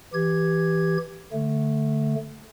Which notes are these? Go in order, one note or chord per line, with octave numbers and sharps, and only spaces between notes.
E3 G4 G#6
D3 A3